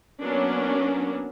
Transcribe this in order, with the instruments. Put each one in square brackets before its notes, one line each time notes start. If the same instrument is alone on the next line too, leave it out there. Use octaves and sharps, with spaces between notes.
[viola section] F#3 A#3 B3 C#4 D4